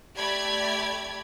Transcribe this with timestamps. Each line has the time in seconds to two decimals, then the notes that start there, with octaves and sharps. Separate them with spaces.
0.16 A3 G4 D5 B5 G#6